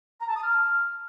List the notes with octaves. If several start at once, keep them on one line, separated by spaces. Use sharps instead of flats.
A#5
A5
D#6
F6